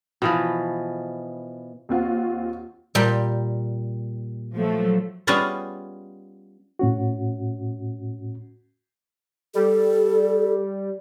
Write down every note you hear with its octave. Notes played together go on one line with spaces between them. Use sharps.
B2 E3 F3
D#2 C4 F4 F#4
A#2 G3 G5
F3 F#3 A3
G3 B3 C#4 F4 G#4 D#5
A2 C#4 F#4
G3 A4